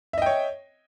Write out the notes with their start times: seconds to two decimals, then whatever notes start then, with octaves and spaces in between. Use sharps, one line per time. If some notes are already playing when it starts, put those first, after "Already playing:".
0.13 E5
0.18 D#5
0.22 G5
0.26 C#5